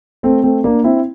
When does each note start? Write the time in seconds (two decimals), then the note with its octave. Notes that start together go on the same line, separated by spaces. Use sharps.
0.23 A3 C4
0.43 A3 C4
0.64 A#3 D4
0.84 C4 E4